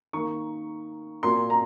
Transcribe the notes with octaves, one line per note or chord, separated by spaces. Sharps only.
D#3 A#3 C#6
A#2 F#3 A#3 C6
A#5